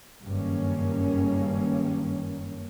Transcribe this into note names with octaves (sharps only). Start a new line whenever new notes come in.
F#1 G2 D#3 A#3 C#4